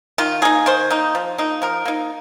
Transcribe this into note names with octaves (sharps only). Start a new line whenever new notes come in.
D#3 F4
A#3 D#4 G#4
D#3 C5
A#3 D#4
F3
A#3 D#4
F3 A#4
A#3 D#4